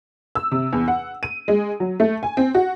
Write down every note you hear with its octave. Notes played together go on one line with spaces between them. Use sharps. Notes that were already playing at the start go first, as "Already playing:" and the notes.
E6
C3
E2
F#5
D#7
G#3
F#3
A3
G#5
C4
F#4